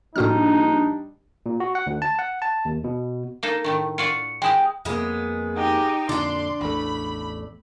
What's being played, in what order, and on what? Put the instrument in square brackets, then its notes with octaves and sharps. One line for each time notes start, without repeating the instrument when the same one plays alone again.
[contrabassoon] A#1 [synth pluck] A2 F#4 F6 [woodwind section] G3 D4 [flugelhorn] D#4
[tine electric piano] A#2
F#4
F#5
D2
A5
F#5
A5
D#2
B2
[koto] A#3 D#4 A4
A2 D#3 A3
[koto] F4 F#4 D5 [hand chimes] C#7
[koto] G#3 E4 G4 [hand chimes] G5 D#6
[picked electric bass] F2 A#3 [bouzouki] G#3 B3
[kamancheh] D#4 G4
[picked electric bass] F2 A#2 D3 [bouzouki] D4 D5 [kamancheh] C6
[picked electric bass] A1 E2 A3 [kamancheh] B5